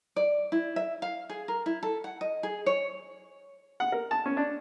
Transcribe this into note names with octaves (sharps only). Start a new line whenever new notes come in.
D5
E4
E5
F5
G#4
A#4
E4
A4
F#5
D#5
G#4
C#5
F#5
A#4
A5
C#4
D4